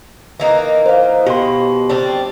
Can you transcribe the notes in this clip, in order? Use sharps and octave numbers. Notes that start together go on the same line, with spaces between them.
E3 A#3 D#4
C5 F5
B2 G4 C6
G3 C4 D4